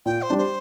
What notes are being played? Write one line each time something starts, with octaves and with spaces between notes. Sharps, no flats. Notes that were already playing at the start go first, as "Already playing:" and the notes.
A#2 G5
C5
G3 D4
C5